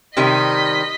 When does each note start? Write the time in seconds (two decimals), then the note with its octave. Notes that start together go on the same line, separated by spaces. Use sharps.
0.17 C3 D#3 G3 D#5 B6